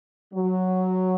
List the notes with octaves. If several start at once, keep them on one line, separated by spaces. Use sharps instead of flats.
F#3